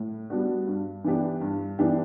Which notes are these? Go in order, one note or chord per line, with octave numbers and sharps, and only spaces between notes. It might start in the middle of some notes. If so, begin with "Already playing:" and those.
Already playing: A2
G3 B3 D4 F#4
G2
E3 B3 D4 G4
G2
E3 B3 D4 G4